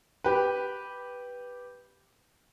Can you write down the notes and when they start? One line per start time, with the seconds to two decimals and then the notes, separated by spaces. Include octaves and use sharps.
0.24 G4 B4